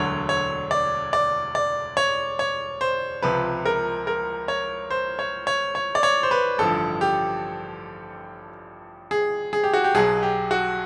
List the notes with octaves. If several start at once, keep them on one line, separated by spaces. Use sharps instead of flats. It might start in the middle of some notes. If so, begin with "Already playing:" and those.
Already playing: E1 D2 D3 F#3 C#5
C#5
D5
D5
D5
C#5
C#5
C5
C#2 C3 F3 B4
A#4
A#4
C#5
C5
C#5
C#5
C#5
D5
C#5
C5
B4
A1 G2 D3 F3 A4
G4
G#4
G#4
G4
F#4
G4
B1 B2 F#3 G#4
G4
F#4